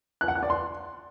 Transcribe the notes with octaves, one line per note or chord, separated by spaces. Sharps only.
F#6
F#5
F#6
D5
C6